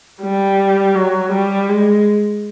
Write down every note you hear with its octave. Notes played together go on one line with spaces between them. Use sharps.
G3
F#3
G3
G#3